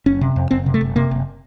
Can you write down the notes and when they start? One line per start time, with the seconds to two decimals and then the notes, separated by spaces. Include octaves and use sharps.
0.06 F#1 C#4
0.21 C3
0.36 F2
0.51 F#1 C4
0.66 C3
0.74 A3
0.81 F#1
0.96 C3 A#3
1.11 F#1